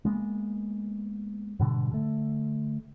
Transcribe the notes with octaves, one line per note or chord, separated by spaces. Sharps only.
G#3 A#3 B3
G#2 B2 D3 G3
D3 A3